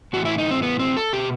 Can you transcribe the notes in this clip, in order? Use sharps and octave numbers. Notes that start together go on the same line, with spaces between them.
A2 E3 F#4
E4
D#4
C4
B3
C4
A4
B2 G4